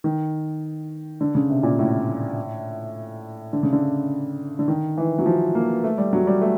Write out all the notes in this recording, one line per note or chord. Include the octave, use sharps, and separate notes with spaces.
D#3
D3
C#3
C3
A#2
A2
D3
C#3
D3
D3
D#3
E3
F#3
F3
A#3
A3
G3
F#3
G3
A3